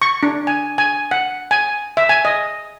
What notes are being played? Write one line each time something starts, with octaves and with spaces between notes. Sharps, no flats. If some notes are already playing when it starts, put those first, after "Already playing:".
C#6
D4
G#5
G#5
F#5
G#5
E5
G#5
D#5